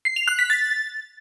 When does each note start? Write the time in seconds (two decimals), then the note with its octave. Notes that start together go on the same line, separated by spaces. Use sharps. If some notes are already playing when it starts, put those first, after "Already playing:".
0.05 C7
0.16 F7
0.28 F#6
0.39 B6
0.50 A6